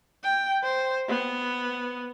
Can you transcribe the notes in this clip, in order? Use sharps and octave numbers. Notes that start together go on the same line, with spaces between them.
G5
C5
B3